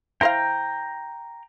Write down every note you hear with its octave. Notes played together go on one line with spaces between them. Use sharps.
E4 C5 F5 G5 A#5